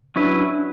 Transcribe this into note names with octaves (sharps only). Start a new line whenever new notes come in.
F#3 C#4 D4 E4 B4